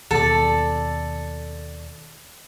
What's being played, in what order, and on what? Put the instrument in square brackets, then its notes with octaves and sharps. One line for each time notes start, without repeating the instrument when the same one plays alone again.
[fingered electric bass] D#2 B2 [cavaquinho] A4 D5